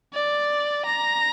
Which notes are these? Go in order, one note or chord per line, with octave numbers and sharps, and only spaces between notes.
D5
A#5